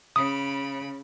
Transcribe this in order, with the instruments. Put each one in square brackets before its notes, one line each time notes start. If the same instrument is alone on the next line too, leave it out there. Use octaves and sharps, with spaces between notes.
[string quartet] C#3 B5 [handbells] D#6